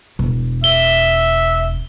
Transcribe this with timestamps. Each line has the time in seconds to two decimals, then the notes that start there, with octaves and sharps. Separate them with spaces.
0.19 E1
0.64 E5 G7